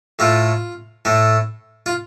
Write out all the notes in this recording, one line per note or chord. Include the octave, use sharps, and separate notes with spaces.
A2 A3 F4
A2 A3
F4